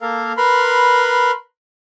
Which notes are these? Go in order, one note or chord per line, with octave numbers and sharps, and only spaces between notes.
A#3 A4 A#4 F5
A#4 B4 B5 C6